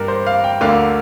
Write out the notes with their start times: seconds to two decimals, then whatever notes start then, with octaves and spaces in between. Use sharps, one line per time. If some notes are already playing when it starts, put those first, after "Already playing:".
Already playing: G2 G3 A#3 A#4
0.08 C5
0.27 F5
0.44 G5
0.61 D2 D3 A#3 F5